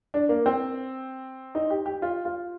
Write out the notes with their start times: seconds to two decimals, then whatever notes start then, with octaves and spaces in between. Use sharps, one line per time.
0.14 D4
0.29 A#3
0.46 C4
1.55 D#4
1.70 G4
1.86 G4
2.02 F4
2.25 F4